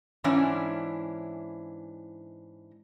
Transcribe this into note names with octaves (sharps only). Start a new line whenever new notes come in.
G#2 E3 C#4 D4 E4